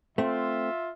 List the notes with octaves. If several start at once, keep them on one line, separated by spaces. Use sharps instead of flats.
A3 C4 F4 E5